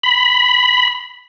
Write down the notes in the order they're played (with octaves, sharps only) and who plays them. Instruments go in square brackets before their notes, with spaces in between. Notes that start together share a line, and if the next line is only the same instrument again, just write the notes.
[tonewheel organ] B5